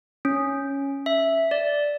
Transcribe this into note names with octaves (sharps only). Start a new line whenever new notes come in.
C#4
E5
D5